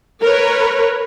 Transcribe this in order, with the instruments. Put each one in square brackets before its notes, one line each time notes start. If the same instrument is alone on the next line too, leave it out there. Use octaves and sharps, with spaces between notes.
[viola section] A#4 B4 C#5